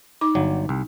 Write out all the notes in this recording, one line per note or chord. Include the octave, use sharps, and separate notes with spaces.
D#4 D6
G1 F#3
C2